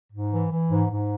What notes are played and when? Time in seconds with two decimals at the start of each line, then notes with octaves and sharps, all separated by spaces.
0.13 G#2
0.32 E3
0.52 E3
0.70 G#2
0.90 G#2